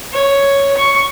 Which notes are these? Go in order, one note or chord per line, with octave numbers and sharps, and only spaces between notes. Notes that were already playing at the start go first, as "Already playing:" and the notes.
C#5
C#6